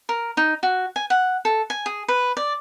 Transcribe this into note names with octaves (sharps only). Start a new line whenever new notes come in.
A#4
D#4
F#4
G#5
F#5
A4
G#5
G#4
B4
D5